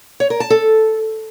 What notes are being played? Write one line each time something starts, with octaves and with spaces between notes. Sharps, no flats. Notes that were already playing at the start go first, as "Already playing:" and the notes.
C#5
A#4
A5
A4